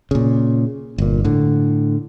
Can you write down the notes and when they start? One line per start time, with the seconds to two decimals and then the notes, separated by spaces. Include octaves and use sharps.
0.11 A#2 C#3
0.98 G1 A#2
1.24 A2 D3